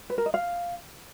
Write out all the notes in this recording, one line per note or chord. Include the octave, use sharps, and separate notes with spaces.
B4
A#4
D#5
F5